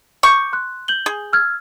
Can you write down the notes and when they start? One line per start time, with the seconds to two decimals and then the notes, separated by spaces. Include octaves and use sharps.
0.23 C#6 D6 G6 C#7
0.53 C6 F#6
0.88 G6 F#7 G7
1.06 G#4
1.33 E6 F6 G#6